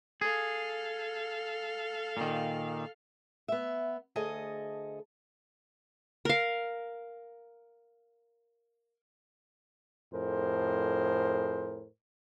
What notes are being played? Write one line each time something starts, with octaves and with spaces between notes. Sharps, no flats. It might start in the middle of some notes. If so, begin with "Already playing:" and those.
G#4 A4 F5
A#2 D#3
B3 E5
D2 G#4 A4 D#5
A#4 F5
F2 A2 G#4 A#4 C5